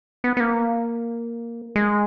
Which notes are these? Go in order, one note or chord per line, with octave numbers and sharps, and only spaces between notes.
B3
B3
A#3
G#3